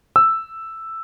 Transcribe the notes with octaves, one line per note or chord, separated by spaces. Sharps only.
E6